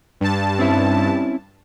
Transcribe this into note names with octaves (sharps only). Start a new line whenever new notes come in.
G2 A5
C4 C#4 E4